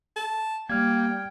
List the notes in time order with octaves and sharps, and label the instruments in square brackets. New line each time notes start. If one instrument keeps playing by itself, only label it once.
[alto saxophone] A5
[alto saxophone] G3 [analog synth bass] A#3 [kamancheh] G5 [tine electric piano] F6 G#6